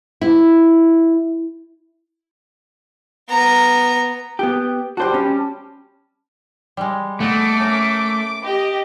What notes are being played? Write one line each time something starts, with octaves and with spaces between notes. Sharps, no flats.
E4
B3 A#5
B3 G4
G3 F#4 C5 D5 A5
C#4
G3 G#3
A3 B3 D#5 A5 D6
C#4 A#4
G4 D#5